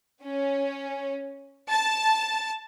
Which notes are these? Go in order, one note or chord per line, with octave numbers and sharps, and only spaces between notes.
C#4
A5